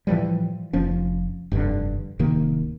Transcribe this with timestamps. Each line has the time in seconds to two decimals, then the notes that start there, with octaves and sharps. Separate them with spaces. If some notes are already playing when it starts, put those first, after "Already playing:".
0.07 A2 E3 F3 G3
0.73 F1 F3 C#4
1.52 F1 G2 B2 D3
2.19 D1 C3 D#3 A#3